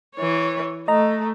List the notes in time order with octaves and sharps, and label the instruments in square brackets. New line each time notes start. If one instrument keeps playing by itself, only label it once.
[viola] E3 C#5
[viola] A3 [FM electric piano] D#5 A#5